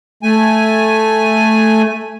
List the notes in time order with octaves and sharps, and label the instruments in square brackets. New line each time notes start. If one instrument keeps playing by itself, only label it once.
[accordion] A3 G#5